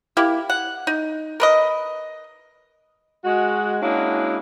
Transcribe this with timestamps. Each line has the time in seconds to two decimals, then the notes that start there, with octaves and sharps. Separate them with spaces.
0.17 A#3 E4 G4
0.50 F#5
0.87 D#4
1.40 A#4 B4 D#5
3.25 G#3 F#4
3.81 G#3 A#3 C#4 D4 E4 F#4